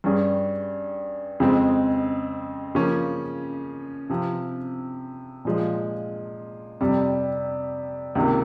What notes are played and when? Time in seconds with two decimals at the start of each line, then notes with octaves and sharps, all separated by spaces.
0.04 G2 G3 C#4 G#4
1.40 F2 C#3 G#3 C4
2.75 C#3 F3 A#3 C#4
4.10 C3 F3 C4
5.45 A#2 F3 G#3
6.81 F2 C3 G3
8.15 C#2 C3 D#3 A#3